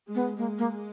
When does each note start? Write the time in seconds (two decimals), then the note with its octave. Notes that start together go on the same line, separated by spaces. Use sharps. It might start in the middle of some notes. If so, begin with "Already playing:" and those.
0.09 G#3
0.15 B3
0.37 G#3 A#3
0.58 A#3